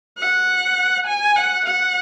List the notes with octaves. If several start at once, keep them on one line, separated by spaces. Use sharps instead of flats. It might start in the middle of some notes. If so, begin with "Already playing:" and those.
F#5
G#5
F#5
F#5